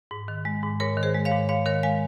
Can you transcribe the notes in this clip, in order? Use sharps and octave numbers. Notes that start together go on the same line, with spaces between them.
G#2
D#3
G#3
G#2
G#2 A#4 C#5
D#3
G#4 C5
G#3
C#5 F5
G#2
G#2 C#5 F5
D#3 A#4 C#5
G#3 F5 G#5